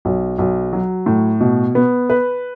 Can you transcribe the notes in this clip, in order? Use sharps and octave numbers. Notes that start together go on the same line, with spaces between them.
B1
B1
F#3
A2
B2
B3
B4